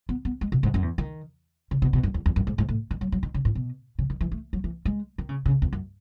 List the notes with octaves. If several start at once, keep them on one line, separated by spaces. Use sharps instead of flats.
B3
B3
G#3
B2
G#2
F#2
E2
D#3
C#3
B2
B2
F#2
E2
E2
F#2
G#2
G#2
A2
D#3
F#3
F#3
D#3
C#3
A2
B2
C#3
D#3
E3
A3
F#3
E3
G#3
D#3
C#3
C#3
E2
F#2